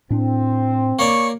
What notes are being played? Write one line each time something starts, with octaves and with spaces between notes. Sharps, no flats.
A2 C4 D4
A#3 C#5 D5 C#6